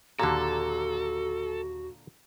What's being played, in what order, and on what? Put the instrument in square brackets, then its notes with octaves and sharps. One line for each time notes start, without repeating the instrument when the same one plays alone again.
[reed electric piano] D#2 G4 A#5 [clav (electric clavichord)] A#2 D3 [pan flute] F#4 [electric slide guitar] A4